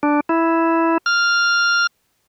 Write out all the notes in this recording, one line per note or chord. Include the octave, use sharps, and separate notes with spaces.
D4
E4
F6